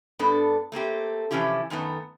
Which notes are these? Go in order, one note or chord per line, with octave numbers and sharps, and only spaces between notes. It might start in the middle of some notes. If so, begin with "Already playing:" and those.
G2 B3 D4 A4
A3 A#3 C4 G4
C3 E3 F3 C#4 E4 G4
F#2 D#3 A3 B3